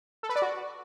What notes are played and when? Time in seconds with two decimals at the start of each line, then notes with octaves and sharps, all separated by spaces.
0.23 A4
0.29 B4
0.36 D5
0.42 F#4